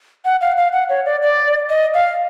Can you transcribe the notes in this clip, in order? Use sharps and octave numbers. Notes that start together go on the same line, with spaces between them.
F#5
F5
F5
F#5
C#5
D5
D5
D#5
F5